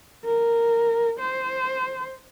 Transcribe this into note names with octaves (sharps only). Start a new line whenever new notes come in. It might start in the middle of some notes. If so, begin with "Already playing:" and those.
A#4
C5